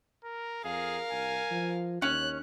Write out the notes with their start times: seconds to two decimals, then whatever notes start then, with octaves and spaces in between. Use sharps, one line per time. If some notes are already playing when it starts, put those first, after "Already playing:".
0.24 A#4
0.64 F2 G#4 A#4 F5
1.11 C2 G#5
1.51 F3
2.02 D#2 C#4 F#6